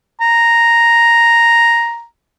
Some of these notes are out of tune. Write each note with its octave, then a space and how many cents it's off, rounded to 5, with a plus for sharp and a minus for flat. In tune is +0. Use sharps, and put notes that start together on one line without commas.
A#5 +0